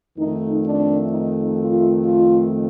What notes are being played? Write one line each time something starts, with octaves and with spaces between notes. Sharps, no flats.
F2 D#3 A3 D#4
D4
D#4
F4
F4